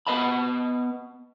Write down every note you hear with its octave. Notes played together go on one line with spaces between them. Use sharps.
B3 B4 D#5 A5 B5